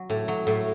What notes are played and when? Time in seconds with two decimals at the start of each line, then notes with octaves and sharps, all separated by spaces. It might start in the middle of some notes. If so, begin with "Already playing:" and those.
Already playing: F#3
0.10 A2
0.28 F#3
0.47 A2